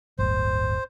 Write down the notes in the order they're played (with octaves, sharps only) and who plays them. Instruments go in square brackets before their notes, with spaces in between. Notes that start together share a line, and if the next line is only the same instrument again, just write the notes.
[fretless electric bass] D1 G1 [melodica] C5